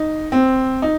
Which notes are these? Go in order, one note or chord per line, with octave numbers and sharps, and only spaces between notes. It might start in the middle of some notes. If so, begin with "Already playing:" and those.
Already playing: D#4
C4
D#4